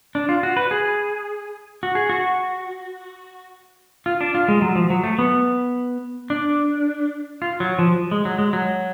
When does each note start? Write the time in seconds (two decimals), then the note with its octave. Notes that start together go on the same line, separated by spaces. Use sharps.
0.15 D4
0.29 F4
0.43 F#4
0.57 B4
0.71 G#4
1.83 F#4
1.95 G#4
2.10 F#4
4.06 F4
4.21 D4
4.35 F4
4.48 G#3
4.62 F#3
4.76 F3
4.90 F#3
5.04 A3
5.19 B3
6.30 D4
7.42 F4
7.60 F#3
7.79 F3
8.11 G#3
8.25 F#3
8.39 G#3
8.53 F#3